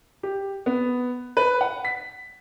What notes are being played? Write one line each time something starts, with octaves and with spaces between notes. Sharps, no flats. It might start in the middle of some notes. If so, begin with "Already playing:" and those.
G4
B3
B4
F#5
B6